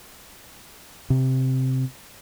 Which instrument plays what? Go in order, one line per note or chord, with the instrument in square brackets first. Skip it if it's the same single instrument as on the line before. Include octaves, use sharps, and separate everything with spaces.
[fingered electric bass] C3